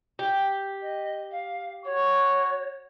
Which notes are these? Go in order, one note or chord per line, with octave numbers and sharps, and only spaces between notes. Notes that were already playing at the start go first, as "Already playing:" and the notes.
G4
D#5
F5
F#4 C#5 C#6